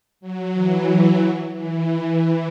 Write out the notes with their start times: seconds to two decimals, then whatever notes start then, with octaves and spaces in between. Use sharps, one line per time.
0.21 F#3
0.54 E3
1.19 F#3
1.52 E3